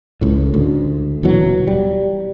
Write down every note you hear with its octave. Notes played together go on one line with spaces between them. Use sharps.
C#2 A2
D2
D#1 B2 E3 F#3
G3